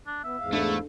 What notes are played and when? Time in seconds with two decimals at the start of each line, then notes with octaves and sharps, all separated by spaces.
0.07 D4
0.24 B3 E5
0.40 E2 G#2 F5
0.53 A3 D4 E4 A4